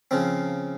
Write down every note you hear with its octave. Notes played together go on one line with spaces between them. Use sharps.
C#3 F3 C4